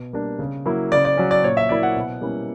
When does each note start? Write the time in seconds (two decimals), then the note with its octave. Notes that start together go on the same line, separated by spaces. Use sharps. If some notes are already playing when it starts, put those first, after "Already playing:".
Already playing: B2
0.13 G3 A#3 D4
0.39 C#3
0.65 F#3 A#3 E4
0.92 C#3 D5
1.05 D5
1.17 F#3 C#4
1.31 D5
1.44 A#2 C#5
1.57 E5
1.69 F#3 A#3 E4 D5
1.83 F#5
1.96 B2
2.21 G3 A#3 C#4 E4